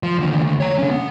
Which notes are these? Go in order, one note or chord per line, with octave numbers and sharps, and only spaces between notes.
F3
D#2 D3
D2
C#5 A#5
D3 C#4
B3